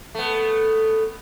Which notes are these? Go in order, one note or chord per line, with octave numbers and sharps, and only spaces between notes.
A3 B3